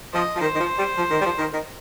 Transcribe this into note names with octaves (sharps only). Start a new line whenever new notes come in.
F3 D#5
F3
D#3 C5
D#3
F3
G3
F3
D#3
G3
F3
D#3
D#3